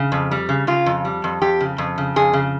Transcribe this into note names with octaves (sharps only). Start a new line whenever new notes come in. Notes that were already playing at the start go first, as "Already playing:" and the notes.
Already playing: C#3
F2
G3
C#3
C#3 F4
F2
G3
F2
F2 G4
C#3
F2
C#3
F2 G#4
C#3